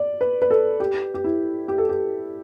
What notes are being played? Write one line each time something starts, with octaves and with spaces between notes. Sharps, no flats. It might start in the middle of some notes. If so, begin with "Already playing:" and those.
Already playing: D5
B4
B4
A4
G4
G4
E4
G4
A4
G4